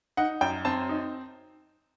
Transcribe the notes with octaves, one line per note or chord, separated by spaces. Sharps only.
D#4 F#5
F#2 G5
C4 A5
D#4